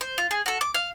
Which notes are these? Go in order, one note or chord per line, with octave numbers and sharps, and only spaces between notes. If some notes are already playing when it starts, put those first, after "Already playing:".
C5
F4
G#4
F#4 A4
D6
F5